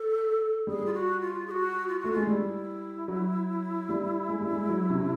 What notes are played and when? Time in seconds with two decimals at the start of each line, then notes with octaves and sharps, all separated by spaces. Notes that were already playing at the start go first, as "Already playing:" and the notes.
Already playing: A4
0.67 G3 G#4
0.86 F4
0.94 F#4
1.21 F4
1.47 G#4
1.51 F#4
1.88 F4
2.00 A3 F#4
2.12 G#3 F4
2.27 G3 E4
3.08 F#3
3.89 G3
4.29 G#3
4.41 G3
4.51 G#3
4.69 F#3
4.90 C3
5.00 C3